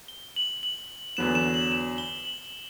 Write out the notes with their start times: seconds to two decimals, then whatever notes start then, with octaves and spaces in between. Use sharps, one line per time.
0.08 G7
0.36 F#7
0.63 F#7
1.17 E2 D3 F#3 B3 E7
1.35 E7
1.54 F#7
1.72 E7
1.98 G7
2.25 F#7